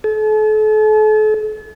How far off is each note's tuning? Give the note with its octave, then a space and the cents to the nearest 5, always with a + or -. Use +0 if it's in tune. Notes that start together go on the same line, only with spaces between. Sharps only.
A4 -40